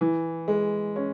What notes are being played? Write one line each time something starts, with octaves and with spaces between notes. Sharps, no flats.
E3
G#3
C#4